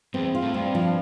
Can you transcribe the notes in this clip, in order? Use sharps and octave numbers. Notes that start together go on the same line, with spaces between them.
E2 C4
F4
A2
G2 C4
F3